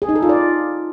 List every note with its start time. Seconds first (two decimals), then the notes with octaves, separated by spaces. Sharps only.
0.02 G#4
0.09 D#4
0.16 A4
0.22 F4
0.29 D5